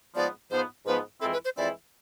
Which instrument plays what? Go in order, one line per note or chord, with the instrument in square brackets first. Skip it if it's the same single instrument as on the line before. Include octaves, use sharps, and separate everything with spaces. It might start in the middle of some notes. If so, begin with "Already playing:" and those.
[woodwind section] G#2 F3 B3 [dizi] D5
[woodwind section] G#2 F3 B3 [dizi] C5
[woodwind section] G#2 F3 B3 [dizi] B4
[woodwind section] F2 E3 G#3 C4 E4 [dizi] A4
[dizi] B4
C5
[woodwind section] F2 E3 G#3 C4 E4 [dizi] D5